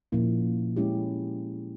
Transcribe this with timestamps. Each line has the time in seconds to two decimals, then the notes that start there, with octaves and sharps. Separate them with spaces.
0.12 A#2 F3 A#3 C#4 E4
0.76 G#3 C#4 E4 G4